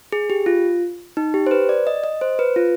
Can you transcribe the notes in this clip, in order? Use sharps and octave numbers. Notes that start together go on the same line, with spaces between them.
G#4
G4
F4
D#4
G4
C5
B4
D5
D#5
D#5
C5
B4
F4